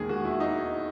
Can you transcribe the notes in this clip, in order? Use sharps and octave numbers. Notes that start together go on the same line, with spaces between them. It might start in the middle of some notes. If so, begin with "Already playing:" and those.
Already playing: E1 D#2 D#3 G#3 G#4
F#4
E4
D#4